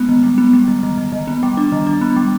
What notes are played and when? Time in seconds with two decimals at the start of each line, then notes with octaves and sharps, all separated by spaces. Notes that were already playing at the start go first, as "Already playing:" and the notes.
Already playing: G#3 B3
0.09 D#3
0.23 G3
0.38 B3
0.53 G3
0.68 D#3
0.83 D#3
0.98 D#3
1.12 D#3
1.27 B3
1.43 G3
1.57 D4
1.72 D#3
1.87 D4
2.01 B3
2.16 G3